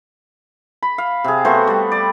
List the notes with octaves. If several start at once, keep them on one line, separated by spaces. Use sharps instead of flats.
B5
F5
C3 G#4
A3 B3 F#4 C5
G3 F#5
D5